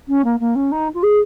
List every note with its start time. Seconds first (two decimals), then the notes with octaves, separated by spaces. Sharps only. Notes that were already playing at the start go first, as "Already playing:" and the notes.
0.08 C#4
0.24 A#3
0.40 A#3
0.55 C#4
0.72 D#4
0.94 F4
1.03 G#4